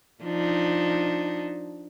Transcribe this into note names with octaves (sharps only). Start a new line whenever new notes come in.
F3 D4 D#4